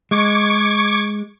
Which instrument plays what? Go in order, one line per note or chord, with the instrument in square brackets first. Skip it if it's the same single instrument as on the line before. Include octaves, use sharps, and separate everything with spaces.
[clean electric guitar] G#3 [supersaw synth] C#6 D6 G#6